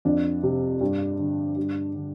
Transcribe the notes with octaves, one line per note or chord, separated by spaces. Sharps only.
F2 D4
C3
G2
D3
G2
D3